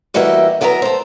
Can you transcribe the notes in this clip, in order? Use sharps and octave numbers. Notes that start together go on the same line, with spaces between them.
E3 G3 A#3 F#4 D#5 E5
E2 F#3 B3 A#4 D5 A#5
A4 C5